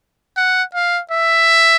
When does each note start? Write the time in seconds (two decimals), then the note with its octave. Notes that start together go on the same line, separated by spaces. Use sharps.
0.37 F#5
0.74 F5
1.11 E5